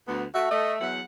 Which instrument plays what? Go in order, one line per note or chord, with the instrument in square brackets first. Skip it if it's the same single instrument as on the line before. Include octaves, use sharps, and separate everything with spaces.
[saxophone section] D2 [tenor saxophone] B3
[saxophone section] A3 [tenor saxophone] F#4 [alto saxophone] E5
[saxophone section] A3 [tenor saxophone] D#5
[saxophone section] E2 B3 F#5 [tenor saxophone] F#3